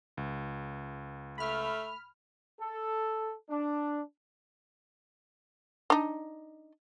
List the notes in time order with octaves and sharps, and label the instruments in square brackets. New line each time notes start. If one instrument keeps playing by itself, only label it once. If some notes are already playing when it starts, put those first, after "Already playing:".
[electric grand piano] C#2
[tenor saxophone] A3 [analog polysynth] B5 F6
[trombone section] A4
D4
[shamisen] D4 D#4